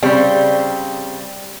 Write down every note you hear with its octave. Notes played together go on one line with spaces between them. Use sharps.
C#3 G3 C4